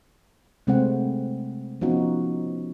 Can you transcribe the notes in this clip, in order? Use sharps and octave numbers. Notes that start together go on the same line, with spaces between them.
C3 G#3 A3 C4 C5 F#5
F3 B3 C#4 D#4 F4 F#4